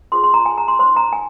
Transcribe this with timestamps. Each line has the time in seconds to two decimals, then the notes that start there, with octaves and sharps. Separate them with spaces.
0.12 F4 G#4 C5 C6
0.24 C6
0.34 A#5
0.46 G#5
0.57 A#5
0.68 C6
0.79 D#4 C5 C6
0.96 A#5
1.13 G#5